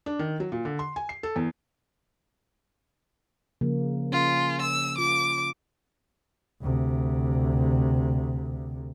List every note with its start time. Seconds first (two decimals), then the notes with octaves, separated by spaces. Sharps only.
0.06 D4
0.19 D#3
0.40 F#3
0.52 A#2
0.65 D3
0.79 C6
0.96 G#5
1.09 C7
1.23 A4
1.36 E2
3.61 C#3 F3 A#3
4.12 C#4 F4
4.62 E6
4.98 F4 D6
6.62 D2 C3